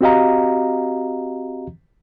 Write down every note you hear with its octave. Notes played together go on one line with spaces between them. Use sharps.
C4 F#4 G4 D#5 F5 A#5